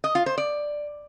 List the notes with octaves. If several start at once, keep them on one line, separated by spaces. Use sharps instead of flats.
D#5
F4
C5
D5